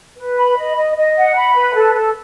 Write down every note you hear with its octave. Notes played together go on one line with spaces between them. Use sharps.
B4
B5
D#5
D#5
D#5
F#5
B5
B4
A4
A4